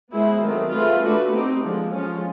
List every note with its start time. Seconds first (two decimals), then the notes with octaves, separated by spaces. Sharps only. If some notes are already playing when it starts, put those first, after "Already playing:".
0.13 G#3 B3 E4 G#4 C5
0.43 D#3 F#3 A3 C4
0.73 A3 C4 F4 G#4 B4
1.04 A3 D4 F#4 B4
1.33 C4 D#4 G4
1.62 D3 F3 G#3
1.93 F3 G#3 C#4 F4